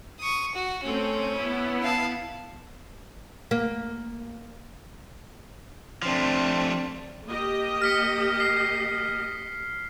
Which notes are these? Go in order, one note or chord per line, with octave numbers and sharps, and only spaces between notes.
C#6 D#6
F#4
A3 C4 C#4
B3 E4
F5 A5
A#3
F3 A3 C4 D4
A#3 G4 D#5
F6 B6 C#7
C7